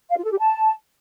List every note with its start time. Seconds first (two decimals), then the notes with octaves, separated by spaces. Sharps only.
0.10 F5
0.17 F4
0.24 A4
0.31 G4
0.39 A5